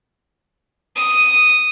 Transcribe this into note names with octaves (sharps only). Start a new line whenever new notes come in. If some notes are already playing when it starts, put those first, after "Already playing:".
D#6